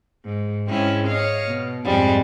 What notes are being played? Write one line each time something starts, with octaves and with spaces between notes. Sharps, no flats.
G#2
G#2 G#3 C4 C#4 E4
C#5 D#5 F5
B2
F2 G#2 G3 G#3